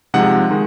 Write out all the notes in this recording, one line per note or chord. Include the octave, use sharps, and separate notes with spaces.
C3 F3 G#3 D#4 F#5
D#3 G#3 D#4